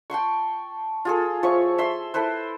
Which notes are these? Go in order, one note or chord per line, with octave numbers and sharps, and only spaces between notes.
G5 A5 C6 C#6
F4 G#4 A4
F3 C#5 E5 C#6
E5 C6
E4 A4 B4 C5